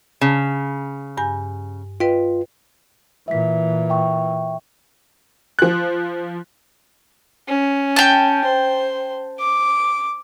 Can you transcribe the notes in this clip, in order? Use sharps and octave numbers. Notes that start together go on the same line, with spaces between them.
C#3
G2 G#5 G6
F4 B4 D#5 G5
A#2 E3 E5 B6
E5 G5 C#6
F3 F#6
C#4
G5 A5
C5
D6